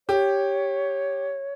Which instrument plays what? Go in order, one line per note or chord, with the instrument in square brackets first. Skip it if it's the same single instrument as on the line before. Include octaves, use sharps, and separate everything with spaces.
[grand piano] G4 [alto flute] C#5